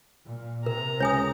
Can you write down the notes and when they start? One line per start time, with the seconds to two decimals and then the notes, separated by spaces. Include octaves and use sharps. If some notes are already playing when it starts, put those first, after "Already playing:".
0.25 A#2
0.66 C3 A#4 A#5
1.00 C#2 C#5 G#5 D#6